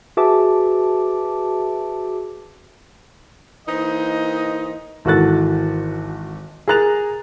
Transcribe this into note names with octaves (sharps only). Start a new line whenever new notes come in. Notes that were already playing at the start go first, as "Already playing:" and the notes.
F#4 G#4 B4 E5 A5 D6
E3 A#3 D#4 C5 D#5
G#1 E3 F#4 A4 F#6 A6
G#4 A#4 A#5 F#6 A6 F7